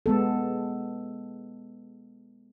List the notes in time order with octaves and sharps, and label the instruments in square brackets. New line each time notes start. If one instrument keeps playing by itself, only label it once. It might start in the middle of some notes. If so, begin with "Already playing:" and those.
[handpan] G#3 B3 A4